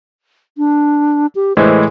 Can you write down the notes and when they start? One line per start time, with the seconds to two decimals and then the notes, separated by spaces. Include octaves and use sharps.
0.58 D4
1.35 G4
1.57 A2 E3 G#3 C5